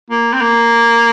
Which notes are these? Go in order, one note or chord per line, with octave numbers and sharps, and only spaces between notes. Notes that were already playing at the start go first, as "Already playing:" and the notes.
A#3
C4
A#3